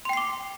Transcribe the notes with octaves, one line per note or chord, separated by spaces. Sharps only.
G5 C6 D6 C7